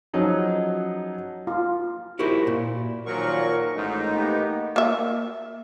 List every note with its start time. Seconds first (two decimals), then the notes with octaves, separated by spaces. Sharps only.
0.13 F3 F#3 C#4 D#4 G#4
1.47 F4
2.19 E4 F#4 G4 A#4 C5
2.47 A#2
3.06 D#2 A#2 F3 F#3 A#4 C#6
3.75 A1 G#2 A3 D#4
4.15 A#3 B3 G4
4.76 A#3 E5